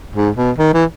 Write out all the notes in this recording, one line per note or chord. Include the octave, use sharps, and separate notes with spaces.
G#2
B2
D#3
E3